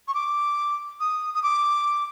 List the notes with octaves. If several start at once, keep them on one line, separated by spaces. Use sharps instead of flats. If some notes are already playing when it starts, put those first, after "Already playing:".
C#6
D6
D#6
D#6
D6